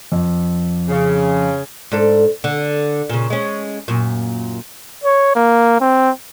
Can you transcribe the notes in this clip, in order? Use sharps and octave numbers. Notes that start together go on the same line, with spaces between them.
F2
C#3
G#2 D4 A4
D3
A#2 C#3
G#3 C#4
F#2 A#2
C#5
A#3
C4